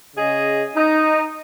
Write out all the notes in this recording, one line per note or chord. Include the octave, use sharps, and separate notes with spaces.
C#3 G#4 D#5
D#4